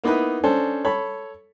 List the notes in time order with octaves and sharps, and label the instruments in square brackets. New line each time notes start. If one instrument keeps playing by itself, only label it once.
[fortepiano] A#3 B3 D#4 E4 B4
C#4 D4 A4 C5
A4 C#5 B5